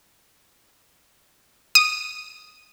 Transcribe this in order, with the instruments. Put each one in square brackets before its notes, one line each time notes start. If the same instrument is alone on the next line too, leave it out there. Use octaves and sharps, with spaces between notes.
[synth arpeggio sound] D#6